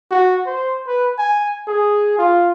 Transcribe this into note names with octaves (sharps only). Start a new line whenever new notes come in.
F#4
C5
B4
G#5
G#4
F4